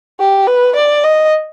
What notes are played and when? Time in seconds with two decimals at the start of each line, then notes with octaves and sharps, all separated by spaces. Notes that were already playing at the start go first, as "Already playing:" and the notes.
0.20 G4
0.47 B4
0.76 D5
1.04 D#5